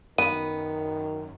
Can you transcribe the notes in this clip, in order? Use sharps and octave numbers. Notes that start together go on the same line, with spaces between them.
F#2 D#3 B3 D#7